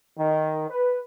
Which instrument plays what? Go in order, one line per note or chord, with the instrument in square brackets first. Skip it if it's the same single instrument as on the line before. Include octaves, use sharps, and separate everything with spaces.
[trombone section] D#3
B4